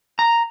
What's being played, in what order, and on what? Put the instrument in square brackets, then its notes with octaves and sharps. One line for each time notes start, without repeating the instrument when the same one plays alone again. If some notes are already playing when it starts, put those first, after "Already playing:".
[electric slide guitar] A#5